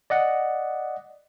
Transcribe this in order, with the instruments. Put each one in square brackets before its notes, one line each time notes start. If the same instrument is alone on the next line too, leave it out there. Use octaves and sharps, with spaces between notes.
[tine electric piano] D5 D#5 F#5